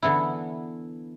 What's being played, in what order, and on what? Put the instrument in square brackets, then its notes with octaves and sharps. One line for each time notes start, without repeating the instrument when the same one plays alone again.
[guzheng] D3 E3 B3 E4